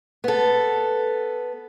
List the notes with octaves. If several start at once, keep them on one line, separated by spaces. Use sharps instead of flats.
B3 A4